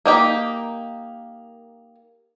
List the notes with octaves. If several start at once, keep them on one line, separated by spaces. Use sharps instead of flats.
A#3 D#4 G4